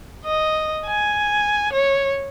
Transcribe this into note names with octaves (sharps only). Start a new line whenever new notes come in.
D#5
G#5
C#5